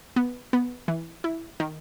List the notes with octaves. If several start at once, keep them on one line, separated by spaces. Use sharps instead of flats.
B3
B3
E3
E4
D#3